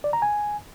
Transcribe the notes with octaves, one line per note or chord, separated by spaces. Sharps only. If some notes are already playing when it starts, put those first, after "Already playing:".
D5
A#5
G#5